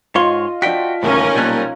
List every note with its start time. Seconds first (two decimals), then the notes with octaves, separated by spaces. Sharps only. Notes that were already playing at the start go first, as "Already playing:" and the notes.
0.15 G#2 F4 C#5 D#5 C6
0.62 F3 F#4 D5 G5 B6
1.03 D#1 A2 C#3 E3 C#4 D#4 A#4
1.35 B1 A#2 F3 G3 F#6